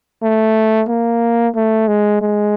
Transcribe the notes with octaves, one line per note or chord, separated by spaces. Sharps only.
A3
A#3
A3
G#3
G#3